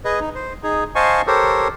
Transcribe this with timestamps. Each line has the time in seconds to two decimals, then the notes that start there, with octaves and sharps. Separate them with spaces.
0.05 G#4 B4 D#5
0.20 D#4
0.35 C5
0.63 D#4 G#4
0.95 C5 D#5 F5 G#5 A5 C#6
1.27 G4 A4 A#4 C5 C#5